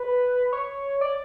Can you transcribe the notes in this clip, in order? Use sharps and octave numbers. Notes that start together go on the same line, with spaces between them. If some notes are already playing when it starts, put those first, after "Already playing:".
Already playing: B4
C#5
D5